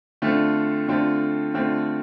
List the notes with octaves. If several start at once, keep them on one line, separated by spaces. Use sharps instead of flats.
D3 A3 C4 F4
D3 A3 C4 F4
D3 A3 C4 F4